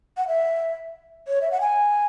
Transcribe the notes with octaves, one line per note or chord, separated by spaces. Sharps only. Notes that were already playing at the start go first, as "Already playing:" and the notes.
F#5
E5
C#5
E5
F#5
G#5